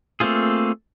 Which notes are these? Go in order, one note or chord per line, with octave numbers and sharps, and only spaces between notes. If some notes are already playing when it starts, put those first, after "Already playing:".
A3 A#3 C4 F4 G#4